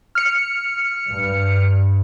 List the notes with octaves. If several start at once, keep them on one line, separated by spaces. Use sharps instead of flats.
F6 C#7
G2